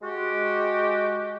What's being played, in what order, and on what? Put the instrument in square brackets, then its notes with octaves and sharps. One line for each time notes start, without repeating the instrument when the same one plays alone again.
[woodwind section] G#3 F#4 G4